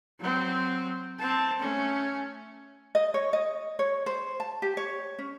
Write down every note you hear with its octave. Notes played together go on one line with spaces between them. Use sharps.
F#3 C4
C4 A5
A3 C#4
D#5
C#5
D#5
C#5
C5
A5
G4
C#5
C#4